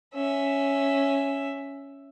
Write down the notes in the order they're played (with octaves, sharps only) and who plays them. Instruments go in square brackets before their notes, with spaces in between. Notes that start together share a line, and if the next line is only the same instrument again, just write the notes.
[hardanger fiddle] C#4 E5